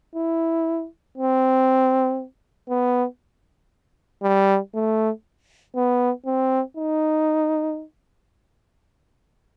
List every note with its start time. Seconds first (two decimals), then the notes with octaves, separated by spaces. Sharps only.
0.15 E4
1.17 C4
2.69 B3
4.23 G3
4.74 A3
5.75 B3
6.26 C4
6.77 D#4